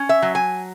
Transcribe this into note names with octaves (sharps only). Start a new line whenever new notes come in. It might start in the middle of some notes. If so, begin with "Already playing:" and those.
Already playing: C#4
E5
F#3
G#5